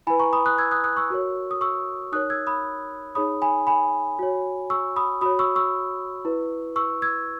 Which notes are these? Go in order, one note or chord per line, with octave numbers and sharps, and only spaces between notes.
E4 B4 G#5 B5
A#5 C#6
B5 D#6
D#6 F#6
E6 G#6
D#6 F#6
D#6 F#6
C#6 E6
F#4 A#4 C#5
D#6
C#6 E6
D#4 A#4 C#5 D#6 F#6
E6 G#6
B5 D#6
D#4 G#4 C#5 B5 D#6
G#5 B5
G#5 B5
F#4 C#5
C#6 E6
B5 D#6
F#4 C#5 B5 D#6
C#6 E6
C#6 E6
E4 B4
C#6 E6
E6 G#6